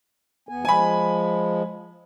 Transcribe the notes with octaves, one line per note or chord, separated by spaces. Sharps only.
E2 B3 G#5
F3 G#3 G#5 B5